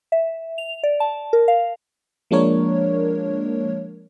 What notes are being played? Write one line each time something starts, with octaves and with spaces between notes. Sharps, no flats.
E5
F7
D5
A5
A#4
F5
F3 G#3 A#3 D4 A#4 C#5